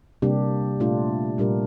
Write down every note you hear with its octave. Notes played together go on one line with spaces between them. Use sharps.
C3 G3 A#3 D4 G4
A#2 A3 D4 F4
A#2 G3 D4 G4 A#4